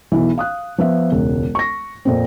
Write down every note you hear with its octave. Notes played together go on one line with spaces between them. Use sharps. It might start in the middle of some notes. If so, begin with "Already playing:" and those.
B1 E3
F5 D#6 F#6
F3 B3 E5
E1 C#2
C#6 A#6
F2 A#2 C4